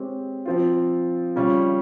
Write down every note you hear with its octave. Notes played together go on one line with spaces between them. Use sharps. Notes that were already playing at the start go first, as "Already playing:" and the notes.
Already playing: G#3 C4 G4 C#5
F3 C4 F4
C#3 G3 C#4 F4